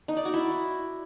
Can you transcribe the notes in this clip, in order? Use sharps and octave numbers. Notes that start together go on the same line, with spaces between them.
D#4
D5
F#4
E4